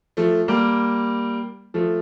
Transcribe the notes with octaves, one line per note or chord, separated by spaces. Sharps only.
F3 A3
G3 A#3
F3 A3